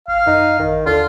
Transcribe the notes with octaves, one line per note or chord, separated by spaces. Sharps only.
G#1 F5
F#2 D#4
A1 D#3
D#2 D3 F4